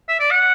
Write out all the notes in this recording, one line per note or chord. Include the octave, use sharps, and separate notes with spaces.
E5
D5
F#5